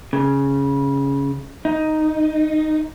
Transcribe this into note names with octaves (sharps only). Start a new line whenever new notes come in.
C#3
D#4